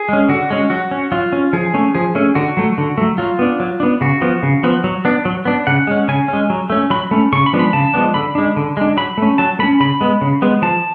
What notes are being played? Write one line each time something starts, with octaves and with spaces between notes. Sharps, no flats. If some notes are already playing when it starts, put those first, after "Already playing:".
Already playing: G#4
G#3 C#4
D3 F#4
G#3 C#4
F#3 F#4
C#4
F#3 F4
C#4
F3 G#4
A3 C#4
F3 G#4
A3 C#4
D3 F#4
F#3 A3
D3
F#3 A3
F#3 F4
B3 D4
F#3
B3 D4
C#3 F#4
F3 B3
C#3
F3 B3
F#3
B3 D4
F#3
B3 D4
C#3 F#5
G#3 C#4
C#3 G#5
G#3 C#4
F#3
A3 C#4
F#3 B5
A3 C#4
C#3 C#6
B5
F3 G#3 B3 D4
B5
C#3 A5
F3 G#3 B3 D4
D3 B5
G#3 D4
D3
G#3 D4
F#3 B5
A3 C#4
F#3 A5
A3 C#4 B5
C#3 B5
G#3 B3
C#3
G#3 B3
F3 A5